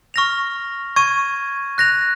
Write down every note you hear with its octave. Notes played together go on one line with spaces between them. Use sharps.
C#6 F6 A#6 F7
C#6 G#6 D#7
F#6 A#6 F7